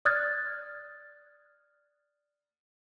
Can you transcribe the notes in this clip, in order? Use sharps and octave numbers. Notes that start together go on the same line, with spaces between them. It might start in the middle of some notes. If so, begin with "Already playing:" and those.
D5 D#6 F6 F#6 G#6 A6